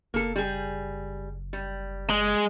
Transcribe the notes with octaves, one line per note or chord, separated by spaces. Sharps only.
F#1 A#3 A4
G3 G#4
G3
G#3